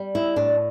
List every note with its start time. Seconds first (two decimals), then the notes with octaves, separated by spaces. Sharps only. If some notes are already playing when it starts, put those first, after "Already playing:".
Already playing: G3
0.15 E4
0.36 A2 D4